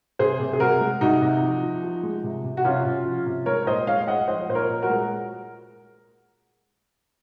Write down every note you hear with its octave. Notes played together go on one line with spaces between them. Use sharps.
C3 G#4 C5
C3
G#4
C3 F#4 A#4
G#3
C3 D#4 F#4
C3
F3
F3
F3
G#3
C3
C3
F#4
C3 C#4 F4
C3
F3
C3
G#3 A#4 C#5
C#5
A#2 C5 D#5
G#3 C#5 F5
G#3 D#5 F#5
F3 C5 D#5
A#2 C5
A#4 C#5
A#2
F#4 A#4
G#3